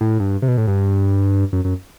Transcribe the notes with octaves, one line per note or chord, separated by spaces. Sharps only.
A2
G2
C3
B2
A2
G2
F#2
F#2